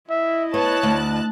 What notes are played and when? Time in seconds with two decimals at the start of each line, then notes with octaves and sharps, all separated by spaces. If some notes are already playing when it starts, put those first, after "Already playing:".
0.10 E4 D#5 E5
0.54 B3 C#5 A5 F#6
0.83 D2